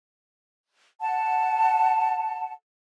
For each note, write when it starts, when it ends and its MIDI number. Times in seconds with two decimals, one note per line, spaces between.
1.01 2.51 78
1.01 2.51 81